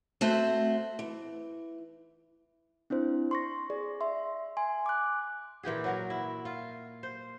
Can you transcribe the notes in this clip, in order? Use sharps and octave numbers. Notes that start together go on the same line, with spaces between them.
A3 C4 F#4 C5 E5
E3
C4 D4 E4 C5
C6 C#6 A#6
G#4 D5
E5 C6
G#5 C6
D6 F#6
A#2 E3 G4 G#4
F#3 F#4 A#4
E4
F4
C5